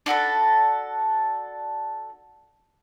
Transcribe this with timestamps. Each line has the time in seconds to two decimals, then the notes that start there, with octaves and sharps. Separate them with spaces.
0.06 D4 F#4 A4 B5